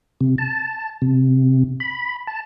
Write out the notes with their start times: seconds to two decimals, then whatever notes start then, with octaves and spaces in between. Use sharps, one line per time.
0.21 C3
0.38 A5
1.02 C3
1.80 B5
2.27 A5